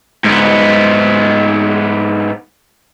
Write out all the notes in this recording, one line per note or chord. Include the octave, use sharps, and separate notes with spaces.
G#2 B3